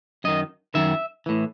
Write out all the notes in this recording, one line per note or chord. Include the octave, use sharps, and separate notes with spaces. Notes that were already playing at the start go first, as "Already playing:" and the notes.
F#2 D#3 D#5
F#2 D#3 E5
A2 E3